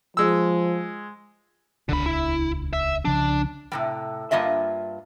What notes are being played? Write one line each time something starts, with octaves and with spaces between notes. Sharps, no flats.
F3 G#3 E6
D#1 C#2 D3 D4 B5
E4
E5
C2 C#3 F3 D4
A2 C3 G3
G2 A#3 F4 D#5 E5